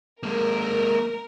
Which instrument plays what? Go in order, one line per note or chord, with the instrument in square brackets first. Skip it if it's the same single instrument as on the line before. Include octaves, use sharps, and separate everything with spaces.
[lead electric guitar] G#3 A#3 [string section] A#4